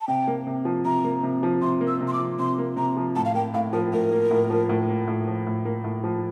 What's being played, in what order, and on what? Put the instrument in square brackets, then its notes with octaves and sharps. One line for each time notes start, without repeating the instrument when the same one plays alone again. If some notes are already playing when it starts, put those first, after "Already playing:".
[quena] A5
[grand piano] C3 [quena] G5
[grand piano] A#3
C3
F3
[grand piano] C3 [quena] A#5
[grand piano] A#3
C3
F3
[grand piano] C3 [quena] C6
[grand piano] A#3
[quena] E6
[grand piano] C3
[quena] C6
D6
[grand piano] F3
[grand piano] C3 [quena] C6
[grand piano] A#3
[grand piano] C3 [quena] A#5
[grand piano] F3
[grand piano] A2 [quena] A5
[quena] F5
[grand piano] A#3 [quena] G5
[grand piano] A2 [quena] F5
[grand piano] F3 [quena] A#4
[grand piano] A2 [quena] A#4
[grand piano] A#3
A2
F3
A2
A#3
A2
F3
A2
A#3
A2
F3